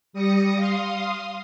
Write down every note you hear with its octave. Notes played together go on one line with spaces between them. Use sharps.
G3 D#6 A#6 C#7
F5 C6 D#6